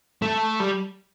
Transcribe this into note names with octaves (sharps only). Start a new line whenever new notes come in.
A3
G3